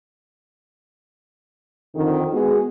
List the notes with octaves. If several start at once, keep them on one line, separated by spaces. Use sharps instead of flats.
F2 D3 D#3
G#3 B3 F#4 G#4